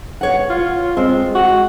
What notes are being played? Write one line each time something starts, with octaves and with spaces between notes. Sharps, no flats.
C#5 F#5
F4
G#3 C4
F#4